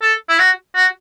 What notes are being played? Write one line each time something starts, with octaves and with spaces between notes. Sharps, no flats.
A4
E4
F#4
F#4